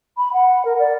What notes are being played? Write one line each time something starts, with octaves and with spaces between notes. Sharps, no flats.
B5
F#5
A#4
D5